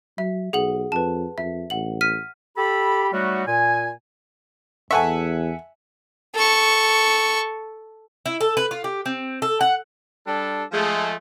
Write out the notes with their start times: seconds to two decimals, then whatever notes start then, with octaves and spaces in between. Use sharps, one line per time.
0.18 F#3 E5
0.53 B1 G#4 F#5 F#7
0.92 F2 B4 A5
1.38 F2 E5
1.70 A1 F#5 F#7
2.01 F6 B6 D#7
2.56 G4 A4 B5
3.12 F#3 G3 A3 D#4 F#4
3.47 A#2 G#5
4.91 E2 A4 E5 F#5 G#5 C#6
6.34 A4 C#6
8.26 E4
8.41 A4
8.57 B4
8.71 F4
8.84 G4
9.06 C4
9.42 A4
9.61 F#5
10.27 G3 D4 A4
10.72 F3 G#3 A3